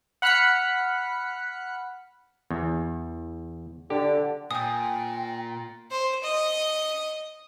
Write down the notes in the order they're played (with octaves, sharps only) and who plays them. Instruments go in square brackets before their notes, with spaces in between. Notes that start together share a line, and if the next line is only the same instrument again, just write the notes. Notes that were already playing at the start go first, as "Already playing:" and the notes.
[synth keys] F#5 B5 F6 F#6 B6 C#7
[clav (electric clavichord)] E2
[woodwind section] D3 [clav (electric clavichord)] G4
[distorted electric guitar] A#2 [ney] G5 [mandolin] G#5 G6 [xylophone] D#6
[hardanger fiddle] C5
D#5